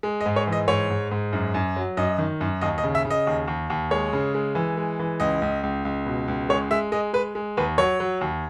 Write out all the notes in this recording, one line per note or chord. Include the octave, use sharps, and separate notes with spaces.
G#3
D#5
G#2
C#5
E3
D#5
G#2 C#5
G#2
G#2
F#2
F#2
F#3
F#2 D#5
D#3
F#2
D#2 D#5
D#5
C#3
E5
C#3
D#5
D#2
D#2
D#2
G#3 C#5
C#3
G#3
E3
G#3
E3
C#2 D#5
C#2
C#2
C#2
B2
C#2
G#3 C#5
G#3 E5
G#3 D#5
G#3 B4
G#3
D#2 B4
F#3 C#5
F#3
D#2